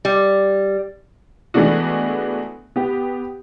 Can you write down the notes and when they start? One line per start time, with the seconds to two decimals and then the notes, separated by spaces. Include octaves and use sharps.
0.05 G3
1.54 E3 G#3 A3 B3 D4 F#4
2.76 B3 G4